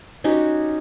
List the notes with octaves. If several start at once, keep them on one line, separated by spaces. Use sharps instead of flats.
C#4 D#4 F#4 G4